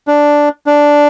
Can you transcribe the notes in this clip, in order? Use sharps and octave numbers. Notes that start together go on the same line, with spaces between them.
D4
D4